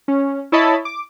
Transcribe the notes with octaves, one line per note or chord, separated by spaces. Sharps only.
C#4
E4 C#5 D#5 A5 B5
D6